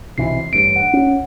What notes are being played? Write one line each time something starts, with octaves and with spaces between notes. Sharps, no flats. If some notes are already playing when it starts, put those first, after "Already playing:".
B1 C3 E3 C7
A1 G2 D7
F#5
C#4